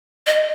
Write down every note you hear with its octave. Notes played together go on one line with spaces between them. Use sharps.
D#5